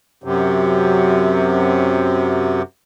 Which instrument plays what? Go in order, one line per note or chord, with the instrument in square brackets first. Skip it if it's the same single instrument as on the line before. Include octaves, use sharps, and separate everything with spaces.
[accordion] F#2 C3